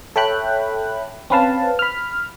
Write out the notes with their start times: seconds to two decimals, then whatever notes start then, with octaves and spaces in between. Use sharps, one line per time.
0.16 A4 C#5 E5 G5 B5 F#6
1.30 C4 C#4 B4 F5 A5
1.79 B5 F6